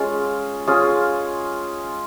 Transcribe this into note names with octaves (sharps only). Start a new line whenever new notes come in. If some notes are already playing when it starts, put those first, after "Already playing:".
Already playing: G#3 C#4 F4
C#4 F4 G#4